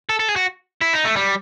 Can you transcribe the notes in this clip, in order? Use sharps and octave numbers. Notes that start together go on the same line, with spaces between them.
A4
A4
G#4
F#4
E4
D#4
A3
G3